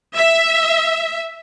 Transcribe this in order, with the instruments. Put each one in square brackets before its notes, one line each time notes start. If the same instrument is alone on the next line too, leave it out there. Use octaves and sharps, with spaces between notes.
[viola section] E5